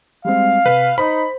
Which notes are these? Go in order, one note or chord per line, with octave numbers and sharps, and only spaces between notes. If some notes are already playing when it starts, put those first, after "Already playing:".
G3 G#3 C4 F5
C3 B4
D#4 C5 B5